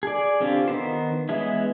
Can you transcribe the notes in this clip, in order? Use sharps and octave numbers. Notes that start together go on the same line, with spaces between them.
G#4 D5
D3 C4 C#4 F4 G4
D#3 B3 C5
E3 G#3 B3 C#4 E4